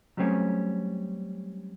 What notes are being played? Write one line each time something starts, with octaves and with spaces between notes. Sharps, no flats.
F#3 G3 A3 C4 C#4